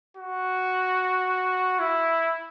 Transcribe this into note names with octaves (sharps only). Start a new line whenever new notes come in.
F#4
E4